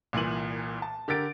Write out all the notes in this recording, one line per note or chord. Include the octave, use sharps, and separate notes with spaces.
C2 A#2 E3 D#7 F#7
A5
D3 G4 A#4 A6 D7